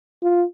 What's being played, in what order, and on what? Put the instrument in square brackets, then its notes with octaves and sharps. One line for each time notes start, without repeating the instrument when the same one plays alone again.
[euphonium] F4